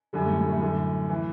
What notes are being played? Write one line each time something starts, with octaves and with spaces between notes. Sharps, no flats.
F#2 D3 G3
A2 A3
A2 A3
A2 A3
F#2 D3
E3